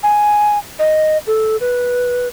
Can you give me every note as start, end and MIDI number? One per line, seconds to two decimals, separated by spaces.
0.03 0.58 80
0.79 1.18 75
1.27 1.57 69
1.61 2.28 71